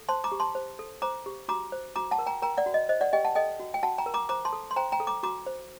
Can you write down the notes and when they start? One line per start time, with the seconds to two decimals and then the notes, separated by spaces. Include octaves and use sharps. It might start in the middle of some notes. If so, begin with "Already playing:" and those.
Already playing: A4
0.09 C5 A5 C6
0.24 A#5 D6
0.32 G4
0.40 A5 C6
0.55 C5
0.79 A4
1.02 C5 A#5 D6
1.26 G4
1.48 F#4 A#5 D6
1.72 C5
1.96 F#4 A#5 D6
2.11 F#5 A5
2.19 A#4
2.26 G5 A#5
2.42 A#4 G5 A#5
2.57 D5 F#5
2.66 F#4
2.74 D#5
2.89 C5 D#5
3.01 D5 F#5
3.13 G4 D#5 G5
3.25 F#5 A5
3.35 A4 D#5 G5
3.60 F#4
3.74 G5
3.83 F#4 F#5 A5
3.98 G5 A#5
4.06 A#4
4.14 A#5 D6
4.29 C5 A#5 D6
4.45 A5 C6
4.53 A4
4.71 C6
4.76 C5 G5 A#5
4.92 G5 A#5
5.00 A4
5.07 A#5 D6
5.23 F#4 A#5 D6
5.46 C5